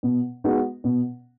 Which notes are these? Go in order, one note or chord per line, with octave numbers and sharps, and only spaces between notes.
B2
G#3 B3 D#4 F#4
B2